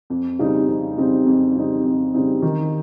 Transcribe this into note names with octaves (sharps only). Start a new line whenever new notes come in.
F2
C#3 G3 C4 D#4
F2
C#3 G3 C4 D#4
F2
C#3 G3 C4 D#4
F2
C#3 G3 C4 D#4
D#3